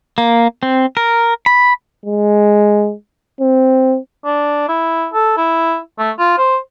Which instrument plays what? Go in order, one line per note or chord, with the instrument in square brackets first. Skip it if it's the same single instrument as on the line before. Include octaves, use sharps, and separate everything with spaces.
[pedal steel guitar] A#3
C4
A#4
B5
[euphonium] G#3
C4
[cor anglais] D4
E4
A4
E4
A3
F4
C5